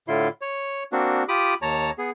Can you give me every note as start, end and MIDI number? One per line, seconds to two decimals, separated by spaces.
0.08 0.28 45
0.08 0.28 50
0.08 0.28 64
0.08 0.28 65
0.08 0.28 84
0.41 0.84 73
0.92 1.24 58
0.92 1.24 60
0.92 1.24 62
0.92 1.24 66
1.29 1.54 65
1.29 1.54 67
1.29 1.54 83
1.29 1.54 86
1.29 1.54 87
1.62 1.91 39
1.62 1.91 73
1.62 1.91 81
1.62 1.91 82
1.98 2.11 59
1.98 2.11 68